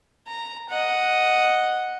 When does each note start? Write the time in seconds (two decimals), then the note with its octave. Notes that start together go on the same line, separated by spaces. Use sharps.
0.27 A#5
0.69 D#5 F#5